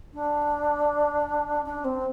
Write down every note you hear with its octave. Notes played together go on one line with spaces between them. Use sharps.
D4
D4
C4